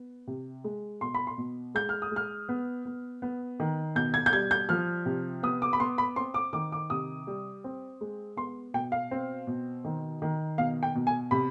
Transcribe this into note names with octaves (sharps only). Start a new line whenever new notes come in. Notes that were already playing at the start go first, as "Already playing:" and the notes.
Already playing: B3
C3
G#3
B2 C6
B5
C6
B2
G#3 G6
F6
D#6
G#3 F6
B3
B3
B3
D#3
B2 G6
G#6
G6
G3 G#6
G6
F3 F6
C3
B3 D#6
D6
B5
B3 C6
B5
C4 C6
D6
D#3 D6
D6
C3 D#6
G3
C4
G#3
B3 C6
B2 G5
F5
C4
B2
D#3
D#3
B2 F5
G5
B2
G#5
C3 B5